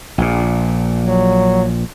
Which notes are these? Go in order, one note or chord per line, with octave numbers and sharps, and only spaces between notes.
A#1 A#2
F#3